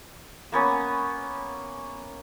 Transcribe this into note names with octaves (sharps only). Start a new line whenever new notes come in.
A#3 B3 C#4